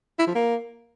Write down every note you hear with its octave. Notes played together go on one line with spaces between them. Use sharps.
E4
F3
A#3